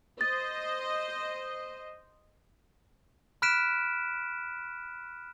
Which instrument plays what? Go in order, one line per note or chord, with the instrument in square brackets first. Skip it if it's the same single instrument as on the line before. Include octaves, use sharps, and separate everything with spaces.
[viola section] C5 D#5 [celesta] A6
[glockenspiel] B5 F6 F#6 B6 D7 E7